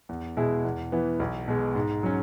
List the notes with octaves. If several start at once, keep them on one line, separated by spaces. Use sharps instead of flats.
E2
B2 G#3 E4 G#4
E2
E3 B3
B1
B2 G#3
G#2
F#3 C#4